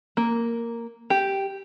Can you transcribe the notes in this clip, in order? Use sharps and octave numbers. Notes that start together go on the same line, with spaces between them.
A#3
G4